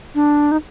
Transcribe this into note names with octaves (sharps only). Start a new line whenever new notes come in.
D4
D#4